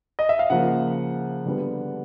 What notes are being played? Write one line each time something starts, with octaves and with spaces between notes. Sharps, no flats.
D#5
E5
F5
C#3 F3 A#3 F#5
D3 G3 B3